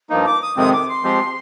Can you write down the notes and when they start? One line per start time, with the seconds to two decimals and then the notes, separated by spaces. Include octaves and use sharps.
0.10 G2 F3 A#3 D#4
0.25 D6
0.41 D#6
0.57 F2 C3 D#3 G#3 C4 D#6
0.72 D6
0.88 C6
1.03 F3 G#3 C4 G4